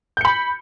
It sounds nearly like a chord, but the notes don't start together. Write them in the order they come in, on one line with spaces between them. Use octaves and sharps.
G6 C#7 B5